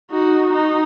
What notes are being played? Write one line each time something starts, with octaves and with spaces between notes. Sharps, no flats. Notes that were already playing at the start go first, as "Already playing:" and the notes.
D#4 F#4
D#4